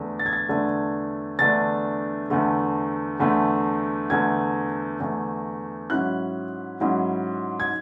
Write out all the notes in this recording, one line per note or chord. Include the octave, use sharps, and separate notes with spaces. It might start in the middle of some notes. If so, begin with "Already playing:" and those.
Already playing: E2 D3 A3 D4
A6
G#6
A6
E2 D3 A3 D4
E2 D3 A3 D4 A6
E2 D3 A3
E2 D3 A3
E2 D3 A3 G#6
E2 D3 A3
G#2 F#3 C#4 E4 F#6
G#2 F#3 C#4 E4
G#6